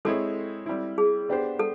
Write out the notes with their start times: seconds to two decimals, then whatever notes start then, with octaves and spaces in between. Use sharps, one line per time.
0.05 G#3 C4 E4 G#4 A4 C#5
0.66 G3 C4 E4
0.98 G#4
1.29 B3 D4 G4 C5
1.59 A4